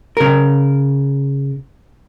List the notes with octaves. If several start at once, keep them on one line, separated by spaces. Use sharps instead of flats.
C#3 A#4